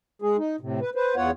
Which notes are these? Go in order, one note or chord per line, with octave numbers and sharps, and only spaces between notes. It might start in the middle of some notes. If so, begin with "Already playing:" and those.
G#3 G#4
D#4
A2 C3
B4
B4 C5
E2 B3 F4 C#5 F#5